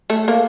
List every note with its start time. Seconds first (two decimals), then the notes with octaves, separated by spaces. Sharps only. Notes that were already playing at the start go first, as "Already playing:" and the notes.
0.10 A3
0.28 A#3